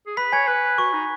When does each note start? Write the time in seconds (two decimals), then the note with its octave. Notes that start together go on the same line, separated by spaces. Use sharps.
0.07 G#4
0.17 B4 B5 B6
0.32 C#5 G#5 G#6
0.47 B4 F#6
0.78 F#4 C#6
0.93 D#4